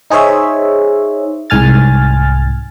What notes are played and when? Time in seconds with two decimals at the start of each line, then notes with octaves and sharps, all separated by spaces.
0.10 D#4 G#4 C5 C#5 E5
1.50 C2 G#2 G#5 F6 A6